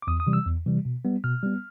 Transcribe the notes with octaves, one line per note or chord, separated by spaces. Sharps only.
D6
E2 D#6
D#6
C3 E3 G3
E6
E2
C3 E3 G3
B2
G3 B3
B2 F6
G3 B3